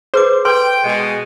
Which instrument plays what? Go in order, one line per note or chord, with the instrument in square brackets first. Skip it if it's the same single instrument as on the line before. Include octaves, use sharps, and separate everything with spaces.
[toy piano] G#4 B4 D6 [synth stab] C5
[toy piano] A4 B4 C6 [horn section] G5
[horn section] B2 G#3